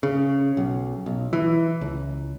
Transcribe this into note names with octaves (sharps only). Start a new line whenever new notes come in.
C#3
B1
B1
E3
C#2